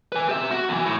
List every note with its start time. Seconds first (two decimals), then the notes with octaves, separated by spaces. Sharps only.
0.12 B4 G#5
0.29 G4 E5
0.51 F#4
0.69 E2 E3
0.86 A2